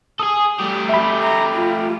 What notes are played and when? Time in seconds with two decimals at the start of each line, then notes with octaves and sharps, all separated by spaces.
0.19 G#4 A4 D#6
0.59 G3 A3 G4
0.89 E5 B5
1.23 A#5
1.55 F4